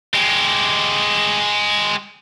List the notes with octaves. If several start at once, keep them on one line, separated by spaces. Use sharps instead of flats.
G#3 G4